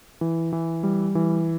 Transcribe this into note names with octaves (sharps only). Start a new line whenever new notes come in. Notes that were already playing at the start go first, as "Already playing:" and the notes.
E3
E3
G3
E3